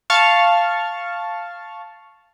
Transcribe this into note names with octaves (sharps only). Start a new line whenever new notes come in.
F5 A5 C#6 F6 A6